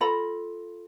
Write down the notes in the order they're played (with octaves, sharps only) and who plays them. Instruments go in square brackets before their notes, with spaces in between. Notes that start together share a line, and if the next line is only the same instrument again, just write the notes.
[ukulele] F4 A4 A#5 B5